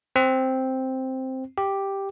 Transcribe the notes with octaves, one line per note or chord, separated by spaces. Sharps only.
C4
G4